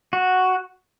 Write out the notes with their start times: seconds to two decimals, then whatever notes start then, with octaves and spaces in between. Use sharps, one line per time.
0.13 F#4